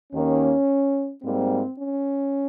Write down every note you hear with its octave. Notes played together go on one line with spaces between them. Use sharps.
D#2 D#3 A#3 C#4
G#2 G3 A#3 C4
C#4